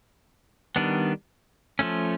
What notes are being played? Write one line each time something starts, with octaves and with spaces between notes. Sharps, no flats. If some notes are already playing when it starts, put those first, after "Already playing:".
D#3 G3 B3 D4
F3 A3 C#4